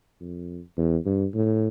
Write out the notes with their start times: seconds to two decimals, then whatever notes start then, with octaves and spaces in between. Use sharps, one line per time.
0.21 F2
0.77 E2
1.06 G2
1.34 A2